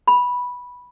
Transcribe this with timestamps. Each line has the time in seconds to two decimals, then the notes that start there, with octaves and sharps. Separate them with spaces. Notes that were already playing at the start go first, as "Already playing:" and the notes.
0.08 B5